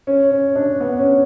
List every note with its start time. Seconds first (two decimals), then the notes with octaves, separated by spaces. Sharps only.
0.07 C#4
0.31 C#4
0.56 D4
0.80 B3
0.99 C#4